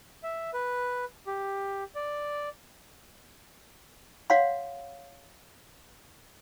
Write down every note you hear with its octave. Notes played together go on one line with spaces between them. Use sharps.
E5
B4
G4
D5
C#5 F5 F#5 C6